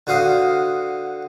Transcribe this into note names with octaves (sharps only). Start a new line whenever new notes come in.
D3 F#4 C5 F5 D#6